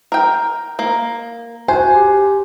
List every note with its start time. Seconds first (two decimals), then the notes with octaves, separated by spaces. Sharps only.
0.12 A#4 G5
0.79 A#3
1.68 F#4 C5 G#5
1.94 G4